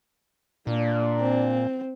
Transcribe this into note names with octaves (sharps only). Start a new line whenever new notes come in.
A#2 A#3 D4
C4